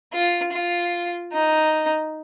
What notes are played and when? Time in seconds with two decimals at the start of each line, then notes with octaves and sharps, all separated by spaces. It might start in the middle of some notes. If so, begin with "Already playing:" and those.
0.14 F4
0.53 F4
1.33 D#4